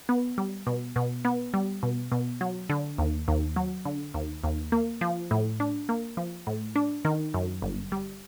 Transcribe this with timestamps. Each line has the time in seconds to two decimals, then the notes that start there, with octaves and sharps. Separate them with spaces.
0.09 B3
0.38 G3
0.67 B2
0.96 B2
1.25 B3
1.54 G3
1.83 B2
2.12 B2
2.41 F#3
2.70 D3
2.98 D#2
3.28 D#2
3.56 F#3
3.85 D3
4.14 D#2
4.44 D#2
4.72 A#3
5.01 F3
5.31 A2
5.60 D4
5.89 A#3
6.17 F3
6.47 A2
6.76 D4
7.05 D#3
7.34 F#2
7.62 G1
7.92 G3